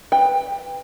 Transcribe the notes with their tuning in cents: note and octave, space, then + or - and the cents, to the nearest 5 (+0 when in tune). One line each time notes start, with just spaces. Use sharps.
B4 +0 G5 +20